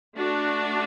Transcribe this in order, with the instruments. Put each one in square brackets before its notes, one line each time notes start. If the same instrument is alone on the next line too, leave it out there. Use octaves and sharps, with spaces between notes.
[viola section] A3 D4 F#4